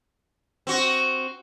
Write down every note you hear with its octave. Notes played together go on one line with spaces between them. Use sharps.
C4 F#4